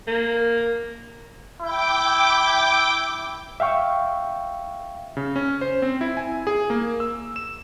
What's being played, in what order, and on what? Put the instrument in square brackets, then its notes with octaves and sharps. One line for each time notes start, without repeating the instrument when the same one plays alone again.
[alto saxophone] A#3
[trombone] E4 [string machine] G5 D6
[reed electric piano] E5 F5 G5 C#6
[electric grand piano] C#3
C#4
C5
C4
E4
G#5
G#4
A#3
E6
E7